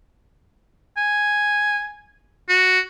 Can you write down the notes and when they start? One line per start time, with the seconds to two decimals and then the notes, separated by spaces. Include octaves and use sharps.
0.97 G#5
2.49 F#4